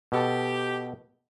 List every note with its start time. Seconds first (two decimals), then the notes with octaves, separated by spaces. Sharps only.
0.12 B2 G4 A4